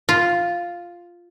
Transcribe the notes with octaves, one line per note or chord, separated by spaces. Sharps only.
F4